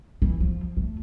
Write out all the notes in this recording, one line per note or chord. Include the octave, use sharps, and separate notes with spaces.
E3
F3
A3